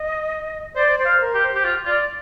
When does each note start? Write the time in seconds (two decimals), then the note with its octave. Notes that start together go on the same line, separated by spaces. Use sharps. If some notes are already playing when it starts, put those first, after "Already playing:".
Already playing: D#5
0.75 C5 D5
0.99 C5
1.06 F5
1.21 A#4
1.34 G4
1.42 C5
1.55 G4
1.64 F4
1.86 F4 D5